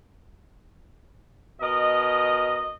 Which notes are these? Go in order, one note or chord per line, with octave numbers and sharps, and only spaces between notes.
B2 A#4 D#5